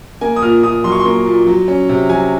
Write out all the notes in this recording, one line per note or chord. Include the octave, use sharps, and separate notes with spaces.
A#3 G#5
D#6
A#2 F6
A#2 D#6
F#3 C6
C#6
C6
A#3
A#2
F#3
C#4
C3
F#3 G#5